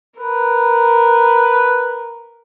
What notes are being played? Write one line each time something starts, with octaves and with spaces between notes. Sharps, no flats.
A#4 B4